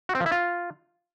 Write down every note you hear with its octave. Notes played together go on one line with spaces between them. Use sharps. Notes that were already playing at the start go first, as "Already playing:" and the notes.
F#4
C4
F3
E4
F4